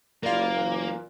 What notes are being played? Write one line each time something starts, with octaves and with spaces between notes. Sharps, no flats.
F#1 G3 A#3 F4 A#4 F5
A#2 E3